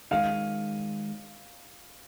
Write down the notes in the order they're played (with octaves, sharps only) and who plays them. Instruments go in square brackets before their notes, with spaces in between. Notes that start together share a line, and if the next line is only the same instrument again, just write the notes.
[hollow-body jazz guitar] D#3 G#3 C#4 [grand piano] F5